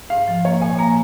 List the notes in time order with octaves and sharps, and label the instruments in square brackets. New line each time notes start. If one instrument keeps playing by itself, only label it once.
[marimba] G#2 [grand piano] F5
[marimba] F3
[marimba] A#3 [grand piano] C#5
[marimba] A#2 [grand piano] G#5
[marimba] A#3 [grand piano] A#5